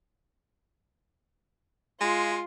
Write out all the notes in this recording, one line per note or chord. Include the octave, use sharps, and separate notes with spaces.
G#3 F4